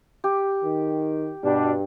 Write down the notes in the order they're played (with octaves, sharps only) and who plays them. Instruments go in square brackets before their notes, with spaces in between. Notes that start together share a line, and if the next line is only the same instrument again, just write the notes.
[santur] G4
[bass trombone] D#3
[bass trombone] G2 [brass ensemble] B2 G3 D4